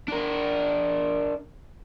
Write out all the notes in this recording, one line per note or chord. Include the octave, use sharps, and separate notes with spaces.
D4 A#4